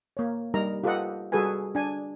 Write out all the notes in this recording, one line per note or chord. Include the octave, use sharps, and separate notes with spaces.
A#3 C#5
G3 D#4 A#4 A#5
F4 G4 A4 B4 D#5 F#5
G3 F#4 G#4 A4 B4 G#5
D4 G#5